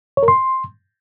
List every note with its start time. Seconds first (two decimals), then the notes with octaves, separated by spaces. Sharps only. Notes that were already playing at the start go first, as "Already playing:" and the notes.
0.17 C#5
0.23 A#4
0.28 C6